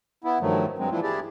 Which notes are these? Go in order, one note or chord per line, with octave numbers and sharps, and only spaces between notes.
B3 E4
G2 D#3 F3 F#3 A3
G2 F#3 G#3 C4
E3 F3 A#3 D4 E4 F4
D4 E4 G4 G#4 D5